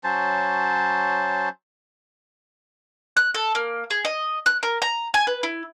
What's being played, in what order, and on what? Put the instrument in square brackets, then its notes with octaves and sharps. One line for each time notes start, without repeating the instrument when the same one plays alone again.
[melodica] F#3 C#4 C5 A5
[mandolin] F#6
A4
A#3
G#4
D#5
F#6
A#4
A#5
G#5
B4
E4